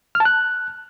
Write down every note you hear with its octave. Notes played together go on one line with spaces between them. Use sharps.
F6
A5
F#6